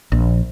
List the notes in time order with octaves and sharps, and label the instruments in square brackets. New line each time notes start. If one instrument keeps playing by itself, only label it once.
[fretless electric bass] A#1